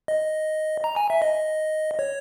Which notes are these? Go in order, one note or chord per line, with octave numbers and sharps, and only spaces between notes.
D#5
A#5
G#5
E5
D#5
C#5